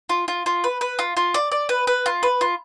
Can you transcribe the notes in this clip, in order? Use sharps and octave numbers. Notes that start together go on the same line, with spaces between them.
F4
F4
F4
B4
B4
F4
F4
D5
D5
B4
B4
F4
B4
F4